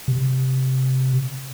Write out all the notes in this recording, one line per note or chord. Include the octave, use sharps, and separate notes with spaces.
C3